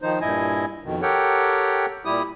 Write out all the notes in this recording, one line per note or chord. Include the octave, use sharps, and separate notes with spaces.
D#3 F3 D#4 C5
G2 A#2 E4 D#5 G#5
F2 B2 D#3
G4 A4 A#4 C#5 F#5 G5
A#2 G3 E4 G4 D#6